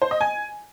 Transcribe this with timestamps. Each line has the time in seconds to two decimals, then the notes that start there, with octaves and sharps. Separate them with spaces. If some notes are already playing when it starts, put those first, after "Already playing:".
0.02 C5
0.11 D#5
0.21 G#5